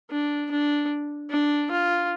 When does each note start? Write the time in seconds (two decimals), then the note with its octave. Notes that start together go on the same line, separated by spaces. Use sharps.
0.10 D4
0.51 D4
1.30 D4
1.71 F4